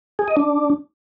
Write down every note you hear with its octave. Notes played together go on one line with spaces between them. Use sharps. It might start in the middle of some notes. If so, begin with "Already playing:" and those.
G#4
D#5
D4